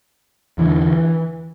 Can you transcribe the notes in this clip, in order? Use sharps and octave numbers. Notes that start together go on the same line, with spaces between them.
E2 D3 E3